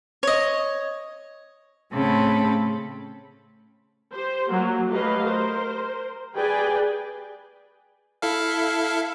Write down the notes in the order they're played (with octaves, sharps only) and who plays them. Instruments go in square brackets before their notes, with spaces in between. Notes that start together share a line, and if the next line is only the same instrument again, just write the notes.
[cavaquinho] C#5 D#5
[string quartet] A2 C#3 A3 C4 A4 B5
[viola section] G4 C5
F#3 A#3 F#4
F#3 A3 G4 B4 D#5 F5
A#4 C5
G4 G#4 B4 D5 G5 G#5
[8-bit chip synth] E4 A4 F5